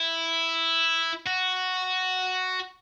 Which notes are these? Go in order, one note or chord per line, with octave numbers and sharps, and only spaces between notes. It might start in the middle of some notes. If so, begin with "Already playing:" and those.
Already playing: E4
F#4